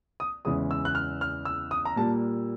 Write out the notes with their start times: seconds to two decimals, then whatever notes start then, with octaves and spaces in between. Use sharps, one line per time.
0.20 D#6
0.45 E2 C#3 E3 G#3 D#6
0.71 E6
0.85 F#6
0.95 F6
1.21 F6
1.45 E6
1.71 D#6
1.85 A#5
1.96 A#2 G3 A#3 A5